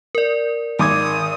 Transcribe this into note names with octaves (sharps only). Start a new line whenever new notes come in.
A#4 D5
G#1 D#3 D6 D#6 G#6